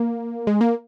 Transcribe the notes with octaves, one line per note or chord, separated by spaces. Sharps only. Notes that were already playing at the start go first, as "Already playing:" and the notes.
Already playing: A#3
G#3
A#3